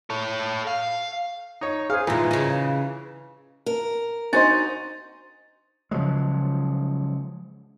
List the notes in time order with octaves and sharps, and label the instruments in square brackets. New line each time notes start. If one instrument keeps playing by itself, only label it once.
[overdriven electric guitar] A4 C#5
F5
[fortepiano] D#4 C#5
[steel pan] G#4 C5 [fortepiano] F5
[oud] A#2 D#4 [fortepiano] E3 [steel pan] F4 A4
[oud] C#3 D#4
[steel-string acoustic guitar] A#4
[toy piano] D4 C6 [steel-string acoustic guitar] D#4 [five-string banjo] F#4 C5 D#5 [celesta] A6
[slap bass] C#3 F3 F#3 G#3